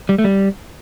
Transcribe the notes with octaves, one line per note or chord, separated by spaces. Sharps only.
G3
A3
G3